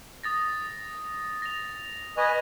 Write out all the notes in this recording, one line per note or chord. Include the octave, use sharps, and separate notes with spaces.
D#6 A6 A#6
A#6 F7
B4 D#5 G#5 C#6 G#6